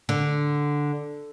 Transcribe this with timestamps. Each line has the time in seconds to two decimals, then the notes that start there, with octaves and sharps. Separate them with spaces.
0.09 D3